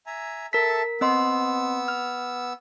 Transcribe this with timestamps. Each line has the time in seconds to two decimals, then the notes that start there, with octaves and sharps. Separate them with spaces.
0.06 E5 G#5 A#5
0.53 A4 A#4 E5 A5 B6
1.01 B3 C4 D#5 C6 E6
1.88 F6